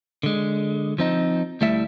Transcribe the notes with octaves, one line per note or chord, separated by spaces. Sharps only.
D3 G#3
F3 C4 D#4
D2 G3 A3 E4 E5